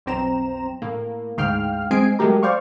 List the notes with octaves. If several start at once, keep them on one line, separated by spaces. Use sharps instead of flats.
B1 F2 C4 A#5 E7
A2 A#3
D2 G#2 F5 G5 F6
G#3 C4 G#4 G#5 C7 D7
F#3 G#3 A3 G4 A#4
C5 D5 F5 C#6